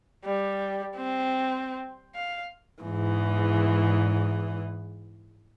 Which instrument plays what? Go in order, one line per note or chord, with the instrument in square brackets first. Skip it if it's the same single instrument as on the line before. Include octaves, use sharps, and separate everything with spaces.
[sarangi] G3
C4
F5
[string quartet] E2 G#2 E3